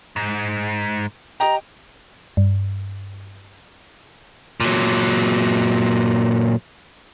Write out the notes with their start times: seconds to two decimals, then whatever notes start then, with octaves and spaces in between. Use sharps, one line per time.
0.16 G#2
1.40 G4 D#5 G5 A#5
2.37 G2
4.60 A#2 F#3